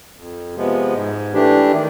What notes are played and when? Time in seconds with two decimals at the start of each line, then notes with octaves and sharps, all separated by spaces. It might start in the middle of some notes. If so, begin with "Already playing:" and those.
0.16 F2
0.55 C3 F3 G#3 B3
0.95 G#2
1.33 E3 A3 D4 G4
1.71 D#3